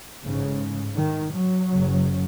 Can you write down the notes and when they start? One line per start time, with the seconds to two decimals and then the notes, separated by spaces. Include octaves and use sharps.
0.24 A1 G#2 C#3
0.97 D#3
1.34 F#3
1.70 F#1 F#2 C#3